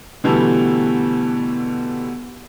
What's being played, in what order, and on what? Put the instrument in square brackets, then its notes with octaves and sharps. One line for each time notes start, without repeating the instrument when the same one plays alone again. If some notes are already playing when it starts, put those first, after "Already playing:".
[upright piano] B2 D3 E3 G3 A3 A4